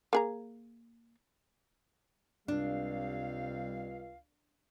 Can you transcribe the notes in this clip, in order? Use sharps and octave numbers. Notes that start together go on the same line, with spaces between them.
A#3 G#4 A#5
C#2 C3 G3 D4 F5